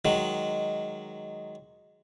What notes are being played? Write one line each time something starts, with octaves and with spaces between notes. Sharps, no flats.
D#3 F#3 G#3